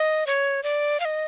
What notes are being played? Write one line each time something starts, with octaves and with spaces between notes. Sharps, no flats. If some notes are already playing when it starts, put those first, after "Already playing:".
Already playing: D#5
C#5
D5
F5
D#5